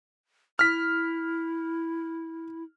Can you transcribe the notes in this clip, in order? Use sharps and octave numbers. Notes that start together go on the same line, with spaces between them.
E4 F6 B6